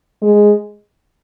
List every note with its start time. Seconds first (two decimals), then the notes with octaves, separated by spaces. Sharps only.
0.22 G#3